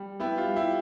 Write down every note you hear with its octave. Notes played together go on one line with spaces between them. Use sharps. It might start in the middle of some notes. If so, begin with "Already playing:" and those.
Already playing: G3
B3 E4 G4
F4
G3
E4 G4